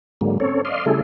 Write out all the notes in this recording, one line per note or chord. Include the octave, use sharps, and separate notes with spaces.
G#2 D3 F#3 G#3 A#3
C4 C#4 A4 C#5
D5 D#5 F5 C6
C#3 G3 A3 E4 G#4 A4